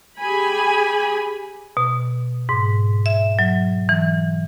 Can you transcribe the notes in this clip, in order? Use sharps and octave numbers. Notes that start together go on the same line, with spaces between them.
G4 G#4 G#5 B5
B2
G#2
E5
F#3
E3